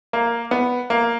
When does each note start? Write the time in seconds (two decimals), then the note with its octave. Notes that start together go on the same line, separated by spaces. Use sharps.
0.13 A#3
0.51 B3
0.90 A#3